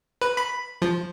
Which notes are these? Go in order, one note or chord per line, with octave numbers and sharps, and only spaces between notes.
B4
B5
F3